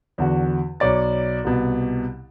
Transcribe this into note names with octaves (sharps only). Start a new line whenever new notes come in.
E2 D3 F#4
B1 C#5 D5 A6
C2 B2